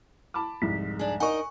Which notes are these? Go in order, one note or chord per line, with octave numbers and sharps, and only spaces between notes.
A5 B5 D6
C2 F2 G#2 B6
D4 G#4
D#4 A#4 D#5 F#5 G#5 C#6